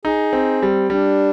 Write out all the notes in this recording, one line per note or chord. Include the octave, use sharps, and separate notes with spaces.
D#4 G#4
C4
G3
G3 D4